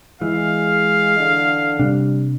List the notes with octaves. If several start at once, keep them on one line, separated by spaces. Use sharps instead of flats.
E3 G#3 F5
D3
C3 G3 D4